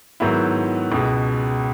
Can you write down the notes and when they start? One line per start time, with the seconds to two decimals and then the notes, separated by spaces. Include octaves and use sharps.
0.20 G#2 D#3 F#3 B3 E4
0.92 C#2 B2 G#3